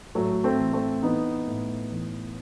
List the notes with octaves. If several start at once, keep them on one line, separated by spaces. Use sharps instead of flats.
A2 F#3 A3
A3 C4
E3
A3 C4
E3 B3 D#4
A2
E3